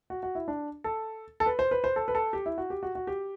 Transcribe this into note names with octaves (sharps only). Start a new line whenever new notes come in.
F#4
F#4
E4
D4
A4
A4
B4
C5
B4
C5
A4
B4
A4
G4
E4
F#4
G4
F#4
F#4
G4